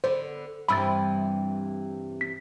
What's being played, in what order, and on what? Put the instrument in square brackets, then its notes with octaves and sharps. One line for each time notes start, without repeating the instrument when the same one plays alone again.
[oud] D3 B3 [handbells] C5
[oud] G2 C3 E3 [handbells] B5 E6 A6
[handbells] B6